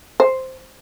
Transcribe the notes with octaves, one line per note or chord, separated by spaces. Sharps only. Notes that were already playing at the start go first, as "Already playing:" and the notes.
C5